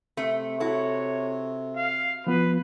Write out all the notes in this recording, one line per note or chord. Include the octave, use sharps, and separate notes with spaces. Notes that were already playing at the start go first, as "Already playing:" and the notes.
C3 A3
E4 F#4 A4 C#5
F5
F3 B3 F4 B4